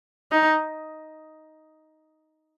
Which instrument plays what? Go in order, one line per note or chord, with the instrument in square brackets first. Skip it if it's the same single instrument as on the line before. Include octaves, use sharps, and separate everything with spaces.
[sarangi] D#4